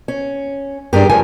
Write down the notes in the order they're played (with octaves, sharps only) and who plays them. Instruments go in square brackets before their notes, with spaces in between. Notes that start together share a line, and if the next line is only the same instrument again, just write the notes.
[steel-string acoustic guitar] C#4
[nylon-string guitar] G2 D4 [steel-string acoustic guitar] G4 G#4 A#4
[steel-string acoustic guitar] F3 A3 A#4 [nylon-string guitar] G#5